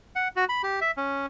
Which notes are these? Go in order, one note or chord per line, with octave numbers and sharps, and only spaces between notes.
F#5
F#4
B5
G4
E5
C#4